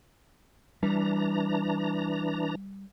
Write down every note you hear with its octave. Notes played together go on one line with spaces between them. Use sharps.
E3 G3 D4 A#5